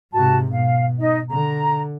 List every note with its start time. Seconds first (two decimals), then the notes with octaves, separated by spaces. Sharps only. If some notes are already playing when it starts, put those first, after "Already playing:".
0.13 G#2 C3 F#4 A5
0.52 B2 F5
0.99 D#4 D#5
1.30 D3 A#5